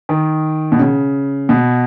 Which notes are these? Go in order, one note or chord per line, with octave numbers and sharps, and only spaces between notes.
D#3
B2
C#3
B2